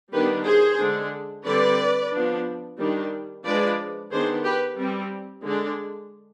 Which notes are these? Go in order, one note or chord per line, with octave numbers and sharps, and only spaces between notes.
D#3 G3 B3 D4 G4 B4
G#4 C5
D3 G#3 D4
D3 G3 C4 B4 D5
F3 B3 D4
D#3 G3 D4
F3 G#3 D4 B4 D5
D#3 B3 D4 G#4 C5
G4 B4
G3 C4
D3 G#3 D4